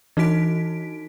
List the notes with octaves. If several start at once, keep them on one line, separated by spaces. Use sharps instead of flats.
E3 D#4 F#4 B6 D7